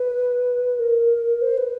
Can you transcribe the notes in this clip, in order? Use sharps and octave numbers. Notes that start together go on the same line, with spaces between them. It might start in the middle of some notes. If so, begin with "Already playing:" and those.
Already playing: B4
A#4
C5
B4